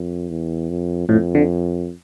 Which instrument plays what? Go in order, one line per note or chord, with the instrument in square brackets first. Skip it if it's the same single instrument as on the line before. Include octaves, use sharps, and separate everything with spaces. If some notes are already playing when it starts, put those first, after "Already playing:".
Already playing: [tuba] F2
E2
F2
[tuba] F2 [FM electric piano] A2
[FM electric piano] D3